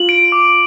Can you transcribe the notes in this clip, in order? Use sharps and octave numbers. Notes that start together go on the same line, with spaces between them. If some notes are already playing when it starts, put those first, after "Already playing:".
Already playing: F4 F#7
D7
D6